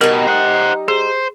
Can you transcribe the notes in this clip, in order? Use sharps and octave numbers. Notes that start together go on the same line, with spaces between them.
B2 G3 D#4 A#4
C5 F#5
G#4 C5